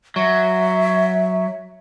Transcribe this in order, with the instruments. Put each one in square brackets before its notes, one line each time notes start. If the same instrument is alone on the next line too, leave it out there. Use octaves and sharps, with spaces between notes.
[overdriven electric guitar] F#3 [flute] E5